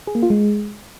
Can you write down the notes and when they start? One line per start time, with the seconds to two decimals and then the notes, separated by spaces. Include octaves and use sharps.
0.07 G#4
0.15 A#3
0.23 F4
0.30 G#3